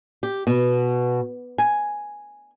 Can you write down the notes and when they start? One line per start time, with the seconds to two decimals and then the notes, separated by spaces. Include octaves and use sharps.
0.23 G4
0.47 B2
1.58 G#5